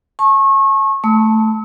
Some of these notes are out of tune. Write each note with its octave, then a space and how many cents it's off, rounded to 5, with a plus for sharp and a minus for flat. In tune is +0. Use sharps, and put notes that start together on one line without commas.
A5 -20 C#6 -30
A3 +0 E6 -45